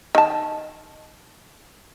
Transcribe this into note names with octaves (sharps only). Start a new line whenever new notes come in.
D#3 A5